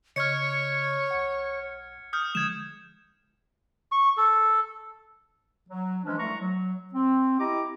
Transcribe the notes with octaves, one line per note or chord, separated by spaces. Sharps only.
C#3 C#5 D#5 F6 G#6 C#7
B1 F#5
D#6 F6 G6
D3 F3 G#3 G#6 E7
C#6
A4
F#3
E3 F3 G#3 C#4 D4
C2 A3 A#5 C#6
F#3
C4
E4 G4 D#5 A#5 D6